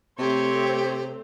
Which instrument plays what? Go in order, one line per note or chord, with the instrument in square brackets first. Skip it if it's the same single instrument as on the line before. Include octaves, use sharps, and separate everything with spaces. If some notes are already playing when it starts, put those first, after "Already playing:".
[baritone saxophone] C3 [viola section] A3 C4 [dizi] G4 [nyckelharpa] C5 C#5